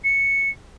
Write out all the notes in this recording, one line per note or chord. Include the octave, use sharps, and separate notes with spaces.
C#7